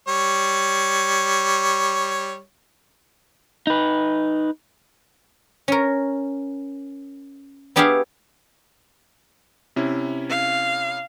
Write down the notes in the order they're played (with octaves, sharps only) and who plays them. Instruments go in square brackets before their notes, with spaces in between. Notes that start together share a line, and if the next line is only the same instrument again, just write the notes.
[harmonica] G3 C#5
[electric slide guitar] D#4 B4
[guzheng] C#4 A#4
B3 D4 G4 G#4 E5 F5
[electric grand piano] C3 C#4 E4
[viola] F5